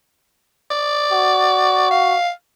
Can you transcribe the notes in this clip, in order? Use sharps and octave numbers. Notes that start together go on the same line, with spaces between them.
D5
F#4
F5